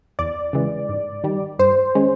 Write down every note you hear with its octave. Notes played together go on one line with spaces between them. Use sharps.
E2 D5
C#3 E3 G#3
G#2
D#3 G3
G2 C5
D#3 G#3 C#4